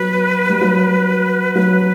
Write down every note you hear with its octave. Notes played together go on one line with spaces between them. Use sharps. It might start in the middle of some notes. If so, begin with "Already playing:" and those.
Already playing: F#3 B4
G3
F#3
F#3 B4